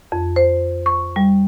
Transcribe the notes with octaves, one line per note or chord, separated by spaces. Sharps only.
F2
C5
C#6
G3